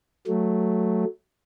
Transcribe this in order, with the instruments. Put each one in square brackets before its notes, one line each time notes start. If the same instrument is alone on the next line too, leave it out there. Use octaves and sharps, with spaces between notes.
[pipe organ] F#3 A3